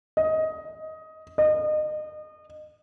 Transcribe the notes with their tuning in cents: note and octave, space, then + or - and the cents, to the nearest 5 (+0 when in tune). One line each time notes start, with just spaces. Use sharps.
D#5 +15
D#5 -30